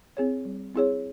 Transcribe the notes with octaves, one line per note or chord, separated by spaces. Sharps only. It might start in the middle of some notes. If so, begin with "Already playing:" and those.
C4 E4 G#4 C#5
G3
C4 E4 G#4 C#5